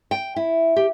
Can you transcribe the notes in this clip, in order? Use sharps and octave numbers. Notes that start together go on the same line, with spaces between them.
G5
E4
G4